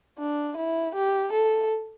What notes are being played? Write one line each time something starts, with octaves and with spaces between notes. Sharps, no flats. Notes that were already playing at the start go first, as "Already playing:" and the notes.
D4
E4
G4
A4